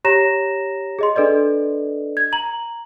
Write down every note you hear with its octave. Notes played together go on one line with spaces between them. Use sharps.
G4 C#5 A#5 A#6 E7
G#4 D#5 C6
D4 A4 B4 D5 D#5
G#6
A#5 F#7